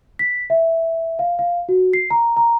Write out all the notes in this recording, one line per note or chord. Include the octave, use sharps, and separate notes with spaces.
B6
E5
F5
F5
F#4
C7
A#5
A#5